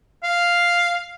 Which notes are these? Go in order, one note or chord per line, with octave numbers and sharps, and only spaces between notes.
F5